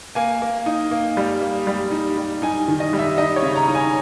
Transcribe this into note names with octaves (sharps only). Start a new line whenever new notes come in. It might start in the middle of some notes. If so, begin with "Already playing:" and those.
A#3 G#5
A#3
D#4
A#3
G3
A#3
G3
D#4
G3
D#4 G#5
D#3
D#5
G3
E5
D#4 D#5
C#5
C#3
A#5
D#4
G#5